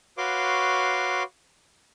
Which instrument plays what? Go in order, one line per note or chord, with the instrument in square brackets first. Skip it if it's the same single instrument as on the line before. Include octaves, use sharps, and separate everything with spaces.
[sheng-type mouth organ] F#4 B4 C#5 F5 C6 D6